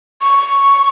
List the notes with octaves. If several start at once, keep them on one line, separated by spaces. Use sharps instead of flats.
C#6